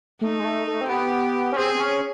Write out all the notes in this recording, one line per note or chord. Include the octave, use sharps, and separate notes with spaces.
A3 D#4
G#3
A3
A3
C4
B3 G4
C#4
C4 G#4
C4
C#4